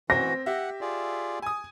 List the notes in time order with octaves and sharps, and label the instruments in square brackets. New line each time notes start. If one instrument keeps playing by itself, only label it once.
[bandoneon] E3 F#4 [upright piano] C4 [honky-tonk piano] A#6
[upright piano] G4 E5 [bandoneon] F#5
[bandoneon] F4 G#4 D5
[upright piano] G#5 D#6